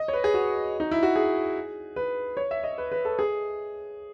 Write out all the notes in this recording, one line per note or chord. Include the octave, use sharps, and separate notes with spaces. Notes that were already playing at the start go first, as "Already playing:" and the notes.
Already playing: D#5
C#5
B4
G#4
F#4
D#4
E4
F#4
G#4
B4
C#5
E5
D#5
B4
B4
A4
G#4